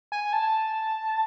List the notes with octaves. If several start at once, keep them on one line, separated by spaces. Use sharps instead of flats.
G#5
A5